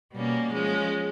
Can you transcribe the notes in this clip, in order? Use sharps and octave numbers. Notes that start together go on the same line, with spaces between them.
B2 G3 A#3 C#4
F3 G#3 C#4